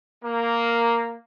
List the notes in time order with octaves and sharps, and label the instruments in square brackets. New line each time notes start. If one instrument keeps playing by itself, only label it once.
[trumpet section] A#3